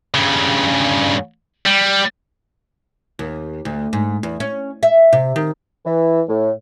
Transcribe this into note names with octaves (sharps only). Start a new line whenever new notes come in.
G2 C#3
G3
D#2
D2
G#2
E2
C#4
E5
C3
D#3
E3
A2